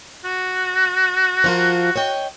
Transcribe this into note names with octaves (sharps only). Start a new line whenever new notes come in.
F#4
F3 F4 A#4
C#5 D#5 G5